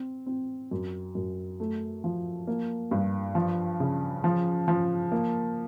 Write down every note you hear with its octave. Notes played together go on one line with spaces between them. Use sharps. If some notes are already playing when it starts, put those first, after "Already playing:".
Already playing: C4
C4
F#2
F#2
A3
F3
A#3
G2
F3
C#3
F3
F3
A#3